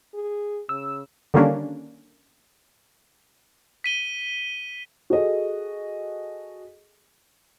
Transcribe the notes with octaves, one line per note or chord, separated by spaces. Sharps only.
G#4
C#3 E6
D3 D#3 G3 A#3 C#4 D4
B6 D#7 G7
F#4 G#4 A4 D#5